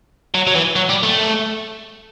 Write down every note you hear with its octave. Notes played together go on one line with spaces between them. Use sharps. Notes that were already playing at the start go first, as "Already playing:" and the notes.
F#3
F#3
E3
F#3
G3
A3